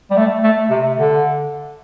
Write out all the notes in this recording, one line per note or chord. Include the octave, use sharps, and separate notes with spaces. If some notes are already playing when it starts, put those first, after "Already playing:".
G3
A3
A3
C3
D3